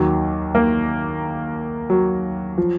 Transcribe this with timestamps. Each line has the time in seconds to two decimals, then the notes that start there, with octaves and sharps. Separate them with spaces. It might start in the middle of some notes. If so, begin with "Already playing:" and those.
Already playing: D#2 D#3 F#3
0.55 A#3
1.90 F#3
2.58 F3